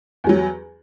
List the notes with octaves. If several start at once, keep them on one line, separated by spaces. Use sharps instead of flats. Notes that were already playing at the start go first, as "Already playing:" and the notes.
E2 F#3 G3